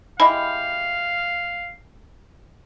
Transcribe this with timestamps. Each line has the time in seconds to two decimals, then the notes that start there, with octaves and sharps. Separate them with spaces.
0.20 G#3 E4 G4 F5 B5